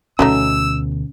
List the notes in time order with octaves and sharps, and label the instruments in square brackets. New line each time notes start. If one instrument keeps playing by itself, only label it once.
[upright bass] D2 B2 [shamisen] F#3 A3 D#4 [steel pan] C#4 [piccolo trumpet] E6